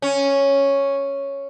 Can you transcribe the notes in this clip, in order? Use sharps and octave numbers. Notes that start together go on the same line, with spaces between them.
C#4